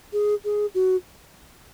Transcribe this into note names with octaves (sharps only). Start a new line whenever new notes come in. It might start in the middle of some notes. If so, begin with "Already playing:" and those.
G#4
G#4
F#4